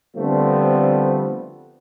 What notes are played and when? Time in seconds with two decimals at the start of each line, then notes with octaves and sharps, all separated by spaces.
0.16 D3 F3 G3 A3 B3 C4